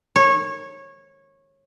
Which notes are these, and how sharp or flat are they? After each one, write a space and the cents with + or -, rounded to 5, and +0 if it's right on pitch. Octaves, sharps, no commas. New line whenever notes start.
C#5 -20